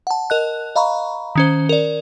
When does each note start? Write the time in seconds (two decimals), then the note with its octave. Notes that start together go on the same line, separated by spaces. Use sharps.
0.07 F#5 A5
0.30 A#4 D#5 F#6
0.76 D#5 F5 A#5 B5 C#6
1.36 D#3 C#4 C5
1.69 A#4 D5